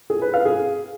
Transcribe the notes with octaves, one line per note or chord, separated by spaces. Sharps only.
G#4
B4
F5
G#4